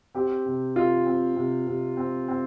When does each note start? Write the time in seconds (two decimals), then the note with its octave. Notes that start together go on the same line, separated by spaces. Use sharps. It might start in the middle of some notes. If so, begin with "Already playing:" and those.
0.15 C4 G4
0.46 C3
0.76 C3 F4
1.06 C4
1.36 C3
1.67 C3
1.97 C4
2.28 C4